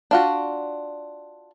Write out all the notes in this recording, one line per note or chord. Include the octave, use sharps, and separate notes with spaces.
D4 F4 F#4